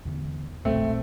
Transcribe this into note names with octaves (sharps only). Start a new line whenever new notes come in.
E2 D3 B3
E1 A#1 A#2 A3 C4